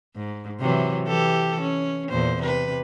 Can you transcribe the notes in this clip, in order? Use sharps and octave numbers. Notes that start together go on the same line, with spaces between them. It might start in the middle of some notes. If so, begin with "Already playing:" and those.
G#2
C3 E3 F#3
E3 G4 A4
C#4
E2 A#2 C5
C3 B4